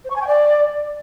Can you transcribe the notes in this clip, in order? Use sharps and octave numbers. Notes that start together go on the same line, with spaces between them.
C5
C#6
G#5
G5
D5